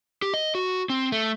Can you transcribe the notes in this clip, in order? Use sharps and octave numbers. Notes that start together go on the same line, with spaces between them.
G4
D#5
F#4
C4
A3